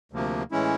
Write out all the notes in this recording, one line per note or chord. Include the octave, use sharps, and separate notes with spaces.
D2 C3 F3 A#3
A2 E3 G#3 C#4 E4